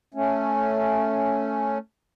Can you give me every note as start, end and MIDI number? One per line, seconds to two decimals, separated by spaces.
0.14 1.78 57
0.14 1.78 61